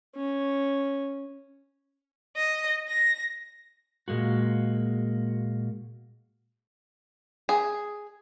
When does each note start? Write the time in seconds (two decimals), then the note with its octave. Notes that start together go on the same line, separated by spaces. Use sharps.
0.15 C#4
2.37 D#5
2.88 A#6
4.08 A#2 G#3 A#3 F#4
7.49 G#4